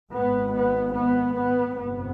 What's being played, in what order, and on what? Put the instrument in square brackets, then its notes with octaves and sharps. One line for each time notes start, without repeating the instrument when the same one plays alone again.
[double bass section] G#1 G#2 B3
B3
B3
B3
G1 F2 C3 B3